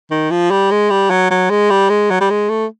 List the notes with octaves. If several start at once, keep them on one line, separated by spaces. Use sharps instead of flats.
D#3
F3
G3
G#3
G3
F#3
F#3
G#3
G3
G#3
F#3
G3
G#3
A3